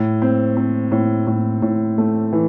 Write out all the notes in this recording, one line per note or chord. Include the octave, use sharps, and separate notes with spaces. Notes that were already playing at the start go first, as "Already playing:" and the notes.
Already playing: A2
C4
C4
A2
A2
A2
A3
E3